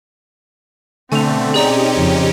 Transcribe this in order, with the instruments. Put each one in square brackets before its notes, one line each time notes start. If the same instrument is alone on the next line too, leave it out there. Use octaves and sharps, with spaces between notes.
[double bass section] B2 [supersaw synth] D3 A3 [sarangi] C4 [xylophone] G#5 F7
[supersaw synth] C#4 D#4 G4 [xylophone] G#4 D5 A#5
[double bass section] F2 C#3